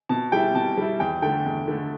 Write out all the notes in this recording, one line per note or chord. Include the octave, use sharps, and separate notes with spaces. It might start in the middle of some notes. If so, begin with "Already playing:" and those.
B2 A5
G3 E4 G5
B2 A5
G3 E4
E2 G5
D3 A3 G5
E2
D3 A3